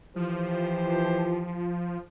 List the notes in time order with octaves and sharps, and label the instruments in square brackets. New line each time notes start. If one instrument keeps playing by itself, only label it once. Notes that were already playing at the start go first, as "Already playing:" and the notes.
[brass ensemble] E3 G4 C5 [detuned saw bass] F3